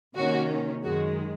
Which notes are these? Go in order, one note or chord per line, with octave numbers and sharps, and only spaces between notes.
C3 D#3 A#3 C#4 F#4
F#2 D#3 G#3 F#4